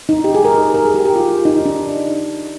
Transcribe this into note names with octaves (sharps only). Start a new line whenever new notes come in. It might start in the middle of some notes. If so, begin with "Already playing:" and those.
D#4
G4
G#4
A#4
G#4
A#4
G#4
G4
G4
F4
D#4
D#4
D4